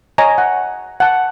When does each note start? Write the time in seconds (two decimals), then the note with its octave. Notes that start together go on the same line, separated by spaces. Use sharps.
0.18 C#5 D#5 G#5 A#5
0.38 F#5
1.00 F#5 A5